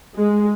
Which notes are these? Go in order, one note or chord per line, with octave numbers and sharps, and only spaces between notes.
G#3